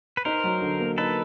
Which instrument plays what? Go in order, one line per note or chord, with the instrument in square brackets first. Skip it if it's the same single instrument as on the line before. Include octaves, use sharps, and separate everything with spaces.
[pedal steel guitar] B4
[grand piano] D#4 [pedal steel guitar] A#4 C5
[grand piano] F#3
D3
A#3
[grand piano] D#4 [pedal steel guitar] A4 B4